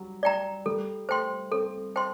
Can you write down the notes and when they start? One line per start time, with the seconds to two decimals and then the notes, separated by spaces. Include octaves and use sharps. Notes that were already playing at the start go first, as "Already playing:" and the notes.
Already playing: F#3 G3
0.23 D5 G5 A#5
0.66 G3 A4
1.09 A3 C5 G5 C6
1.52 C4 A4
1.96 C5 G5 C6